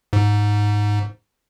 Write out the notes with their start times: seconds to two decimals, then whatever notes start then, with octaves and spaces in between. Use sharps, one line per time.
0.13 G#2